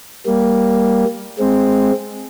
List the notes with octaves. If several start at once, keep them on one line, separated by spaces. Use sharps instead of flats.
G3 A#3
G#3 C4